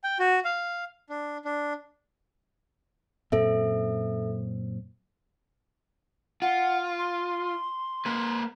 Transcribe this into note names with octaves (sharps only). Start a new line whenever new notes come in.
G5
F#4
F5
D4
D4
F#2 A#2 C4 A4 E5
F4 F#5
C6
A#3 B4